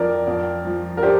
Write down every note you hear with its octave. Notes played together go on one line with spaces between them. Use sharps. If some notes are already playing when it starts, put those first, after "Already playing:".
Already playing: F2 A#4 D5
F2
F3
A#4
D4 G4 C5